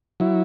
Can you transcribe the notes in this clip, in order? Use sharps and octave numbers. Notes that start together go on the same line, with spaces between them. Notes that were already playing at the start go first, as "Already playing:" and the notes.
F#3 E4